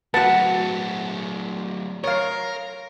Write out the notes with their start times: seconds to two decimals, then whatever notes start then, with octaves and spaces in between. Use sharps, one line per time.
0.14 F#3 A3 F#4 B4 F#5 A5
2.04 A#4 C#5 F5